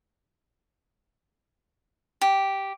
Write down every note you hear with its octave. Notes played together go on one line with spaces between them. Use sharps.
G4